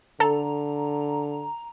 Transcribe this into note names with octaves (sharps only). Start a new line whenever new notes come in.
D3 A4 A#5